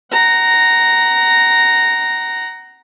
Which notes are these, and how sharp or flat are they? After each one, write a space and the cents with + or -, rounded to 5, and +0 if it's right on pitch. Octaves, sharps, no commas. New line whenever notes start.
F#5 +25 A#5 +0